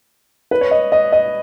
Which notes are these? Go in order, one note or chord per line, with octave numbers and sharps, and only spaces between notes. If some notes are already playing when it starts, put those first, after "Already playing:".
B4
C#5
D#5
D#5
D#5